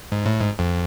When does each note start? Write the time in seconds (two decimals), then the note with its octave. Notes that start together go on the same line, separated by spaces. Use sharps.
0.12 G#2
0.25 A2
0.40 G#2
0.59 F2